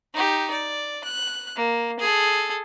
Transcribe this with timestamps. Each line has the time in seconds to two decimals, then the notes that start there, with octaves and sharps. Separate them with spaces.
0.13 D#4 G4
0.51 D5
1.04 F#6
1.56 A#3
1.99 G#4 A4